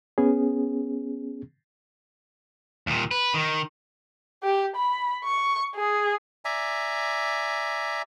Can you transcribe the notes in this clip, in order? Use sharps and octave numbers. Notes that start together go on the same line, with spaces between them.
B3 C#4 G#4
D#2 A#2
B4
D#3
G4
B5
C#6
G#4
D5 E5 G#5 A#5